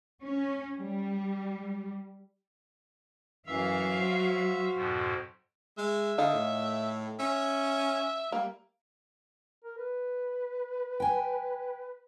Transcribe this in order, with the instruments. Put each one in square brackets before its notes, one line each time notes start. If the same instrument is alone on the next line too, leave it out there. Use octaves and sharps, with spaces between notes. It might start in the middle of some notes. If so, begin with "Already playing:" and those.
[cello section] C#4
G3
[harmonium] F#2 E3 [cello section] F#3 F5 [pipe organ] E5 E6
[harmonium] F#4 C5
[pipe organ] F2 G#2 B2
[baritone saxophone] G#3 [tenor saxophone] E5
[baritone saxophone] D3 [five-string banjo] D#3 D#5 F5
[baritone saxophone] A2
[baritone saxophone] C#4 [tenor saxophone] E5
[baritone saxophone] G3 [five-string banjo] A#3
[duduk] A#4
B4
[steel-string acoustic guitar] G5 G#5